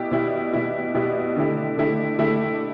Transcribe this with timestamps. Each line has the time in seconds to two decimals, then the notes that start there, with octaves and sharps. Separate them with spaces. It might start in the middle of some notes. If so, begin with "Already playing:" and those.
Already playing: B2 G3 E4 G4
0.11 B2 G3 E4 G4
0.53 B2 G3 E4 G4
0.94 B2 G3 E4 G4
1.36 D3 A3 E4 G4
1.77 D3 A3 E4 G4
2.19 D3 A3 E4 G4